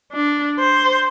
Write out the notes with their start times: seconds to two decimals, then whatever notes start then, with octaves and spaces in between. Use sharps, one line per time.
0.12 D4
0.59 C5